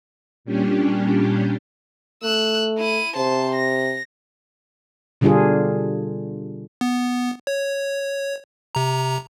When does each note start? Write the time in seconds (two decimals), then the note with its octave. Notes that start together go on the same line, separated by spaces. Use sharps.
0.45 A#2 G3 C#4 D4 G4
2.23 A3 E6 F#6
2.78 E4 D#7
3.16 C3 C5 A5
3.55 A#6
5.21 B2 D3 G3 D4 F4 G#4
6.81 B3
7.47 C#5
8.75 C3 A#5